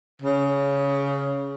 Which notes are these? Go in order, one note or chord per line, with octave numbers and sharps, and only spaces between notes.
C#3